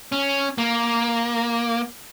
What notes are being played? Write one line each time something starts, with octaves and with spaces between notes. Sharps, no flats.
C#4
A#3